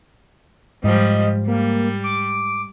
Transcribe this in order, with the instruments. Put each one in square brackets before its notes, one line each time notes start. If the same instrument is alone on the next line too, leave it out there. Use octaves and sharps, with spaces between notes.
[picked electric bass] G#2 [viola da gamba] F3 G3 [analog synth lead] D#5
[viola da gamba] G3 [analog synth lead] A#3
[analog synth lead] D6